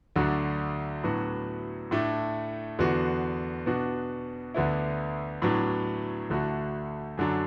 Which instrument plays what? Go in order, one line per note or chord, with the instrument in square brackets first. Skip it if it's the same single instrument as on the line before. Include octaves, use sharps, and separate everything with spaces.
[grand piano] D2 D3 F#3 D4 F#4
A2 F#3 B3 D4 F#4
A2 A3 D4
E2 D3 B3 F#4
B2 B3 D4 F#4
D2 D3 B3 E4
A2 F#3 B3 D4
D2 D3 A3 F#4
F#2 D3 F#3 D4